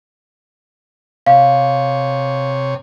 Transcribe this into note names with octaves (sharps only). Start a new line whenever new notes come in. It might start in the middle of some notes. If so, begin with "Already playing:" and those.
C3 C#5 F5